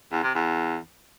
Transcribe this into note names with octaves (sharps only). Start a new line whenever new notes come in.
E2
C3
E2